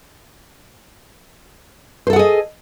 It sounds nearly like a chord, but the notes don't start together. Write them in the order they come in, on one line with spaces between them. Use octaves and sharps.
C5 A4 F#5 G#4 D#5